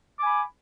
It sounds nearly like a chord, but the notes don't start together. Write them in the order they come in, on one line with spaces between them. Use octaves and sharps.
D6 G#5 B5